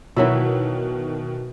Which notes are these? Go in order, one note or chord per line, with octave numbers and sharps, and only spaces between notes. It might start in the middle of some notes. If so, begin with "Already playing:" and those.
B2 D#3 E3 F#3 E4